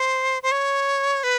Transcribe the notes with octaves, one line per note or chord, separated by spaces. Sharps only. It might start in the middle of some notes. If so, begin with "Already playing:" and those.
Already playing: C5
C5
C#5
B4